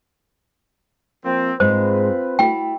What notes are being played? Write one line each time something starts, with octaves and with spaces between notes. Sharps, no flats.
F3 A#3 C4
G#2 G#3 C4 F4 G#4 B4 C5
A3 E4 F#4 G5